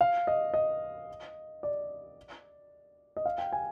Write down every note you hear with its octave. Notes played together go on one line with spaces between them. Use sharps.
F5
D#5
D#5
D5
D#5
F5
G5
G#5